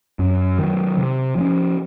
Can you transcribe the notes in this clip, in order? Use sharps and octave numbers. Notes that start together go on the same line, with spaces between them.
F#2
D#3 F#3
C3
F3 G#3 C#4